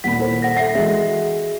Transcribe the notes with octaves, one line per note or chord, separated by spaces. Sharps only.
D#1 A#2 F#5 B5 B6
E4 A4 C5
F#5 A#6 B6
A4 E5 F#5 A#6 C7
E3 G#3 F#4 E5